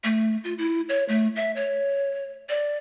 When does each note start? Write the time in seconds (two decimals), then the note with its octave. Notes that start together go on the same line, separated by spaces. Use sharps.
0.04 A3
0.44 F4
0.58 E4
0.89 C#5
1.09 A3
1.36 E5
1.56 C#5
2.49 D5